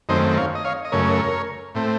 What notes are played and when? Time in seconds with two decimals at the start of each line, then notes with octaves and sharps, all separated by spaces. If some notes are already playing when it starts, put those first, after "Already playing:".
0.09 F#2 D#3 A3 C4 C5 D#5
0.37 C#5 F5
0.55 D#5
0.65 C#5 F5
0.85 D#5
0.92 F#2 C#3 A3 A#4 C#5
1.75 A2 A3 C4